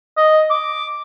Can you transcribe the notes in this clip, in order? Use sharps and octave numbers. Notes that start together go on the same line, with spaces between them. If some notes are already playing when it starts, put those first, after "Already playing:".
D#5
D6